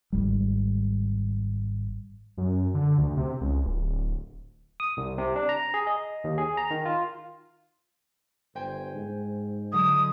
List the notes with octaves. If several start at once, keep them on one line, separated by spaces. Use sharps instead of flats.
G#1 D#2 G3
F#2
D3
D2
C3
C#2
D1
D#6
C2
C3
D4
A#5
G#4
D#5
D#2
G#4
A#5
D#3
F4
G1 C5 G5 G#5
G#2
D3 F#3 G#3 D#6